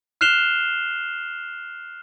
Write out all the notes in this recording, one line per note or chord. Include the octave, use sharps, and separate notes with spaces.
F6 F#6 C7 E7 F7 G7